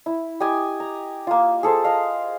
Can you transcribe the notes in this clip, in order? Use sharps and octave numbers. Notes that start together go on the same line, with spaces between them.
E4
G4 D#5 G#5
A#5
A#3 F4
G#4 A4 C5
A#4 D#5 F5